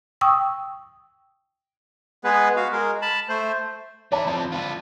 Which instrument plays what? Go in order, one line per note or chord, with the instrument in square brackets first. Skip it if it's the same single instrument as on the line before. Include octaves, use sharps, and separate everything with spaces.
[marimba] G5 C#6 D#6 E6
[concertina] G#3 B3 G#4 B4
F#4 F5
G#3 A#4
A5 B5
A3 C5
[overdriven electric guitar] B3 E5 [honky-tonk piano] D5 A5 B5
[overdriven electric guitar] F3 C4
F4 B4